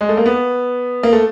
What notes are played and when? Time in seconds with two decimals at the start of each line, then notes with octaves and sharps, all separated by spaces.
0.01 G#3
0.09 A3
0.17 A#3
0.26 B3
1.03 A#3
1.13 A3